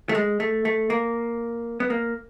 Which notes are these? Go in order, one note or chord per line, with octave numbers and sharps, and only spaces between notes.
A3
G#3
A3
A3
A#3
B3
A#3